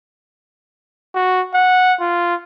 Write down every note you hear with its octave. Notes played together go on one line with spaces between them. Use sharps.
F#4
F#5
F4